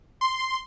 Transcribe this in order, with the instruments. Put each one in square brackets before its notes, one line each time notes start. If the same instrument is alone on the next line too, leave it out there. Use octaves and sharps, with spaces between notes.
[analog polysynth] C6